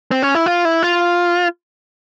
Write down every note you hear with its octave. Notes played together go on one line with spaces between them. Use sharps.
C4
C#4
E4
F4
E4
F4